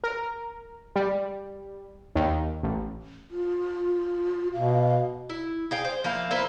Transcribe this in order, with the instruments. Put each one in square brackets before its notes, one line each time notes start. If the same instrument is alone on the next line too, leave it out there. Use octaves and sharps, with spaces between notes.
[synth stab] A#4
G3
D#2
A1
[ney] F4
[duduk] B2 [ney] F5
[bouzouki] E4
G#4 F5 G5
C5
F3 A#3 E4 F5
A#3 E4 B4 C5